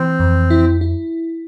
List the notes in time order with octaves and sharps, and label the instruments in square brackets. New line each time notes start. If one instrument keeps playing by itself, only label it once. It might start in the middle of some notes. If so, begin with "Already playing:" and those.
Already playing: [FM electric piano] E3 [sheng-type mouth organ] C4
[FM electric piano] F2
E4
E4